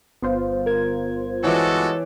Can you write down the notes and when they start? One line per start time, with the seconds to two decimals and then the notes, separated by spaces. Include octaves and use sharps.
0.22 G1 B3 F4 C5
0.66 A#4 G#6
1.44 E3 G#3 F#4 A4 C#5 D6